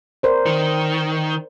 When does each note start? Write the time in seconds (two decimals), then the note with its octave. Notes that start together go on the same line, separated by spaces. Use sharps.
0.23 A#4 C5 D5
0.46 D#3